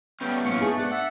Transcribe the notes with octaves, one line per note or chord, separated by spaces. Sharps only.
G3 A3 B3 C#4 G5
A2 E3 F#3 A#3 C#4 C#6
A3 D#4 F4 G#4
D4 D5 F#5
A4 E5 F#5